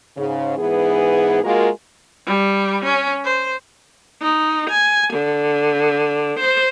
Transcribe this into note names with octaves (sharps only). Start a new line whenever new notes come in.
G#2 C#3
G#2 E3 B3 G#4
G#3 A#3 F4 F#4 A#4
G3
C#4
C5
D#4
G#5
D3
C5